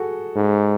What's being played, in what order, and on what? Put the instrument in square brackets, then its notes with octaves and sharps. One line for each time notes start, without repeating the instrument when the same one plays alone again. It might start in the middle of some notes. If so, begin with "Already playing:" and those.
Already playing: [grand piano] F#4 G#4 A4
[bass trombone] G#2